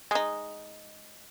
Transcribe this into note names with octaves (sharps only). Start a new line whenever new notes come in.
G#3 D#4